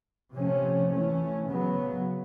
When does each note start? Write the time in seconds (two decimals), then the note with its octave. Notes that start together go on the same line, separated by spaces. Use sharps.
0.34 C3 F3 A3 C#4
0.92 E3 A3 C#4
1.49 C#3 F#3 B3